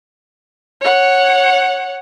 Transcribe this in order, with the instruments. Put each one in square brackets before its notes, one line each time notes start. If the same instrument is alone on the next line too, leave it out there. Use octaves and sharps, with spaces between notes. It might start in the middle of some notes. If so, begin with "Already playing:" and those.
[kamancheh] C#5 F#5